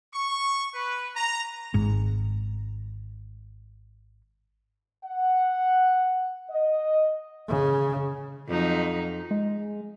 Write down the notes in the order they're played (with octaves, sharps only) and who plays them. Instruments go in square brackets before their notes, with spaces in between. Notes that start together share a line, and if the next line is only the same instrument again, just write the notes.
[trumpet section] C#6
B4
A#5
[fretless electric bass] G#1 G#2
[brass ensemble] F#5
D#5
[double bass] C#3
[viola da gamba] F2 F#3 D#4
[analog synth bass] G#3